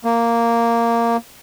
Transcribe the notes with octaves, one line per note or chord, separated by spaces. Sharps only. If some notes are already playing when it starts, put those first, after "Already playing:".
A#3